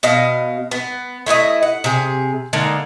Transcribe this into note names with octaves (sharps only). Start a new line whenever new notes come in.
B2 B3 D#5 F5
B3
A3 E4 F4 D#5
F#5
C3 G#4
D3 G#3 A#3 D#4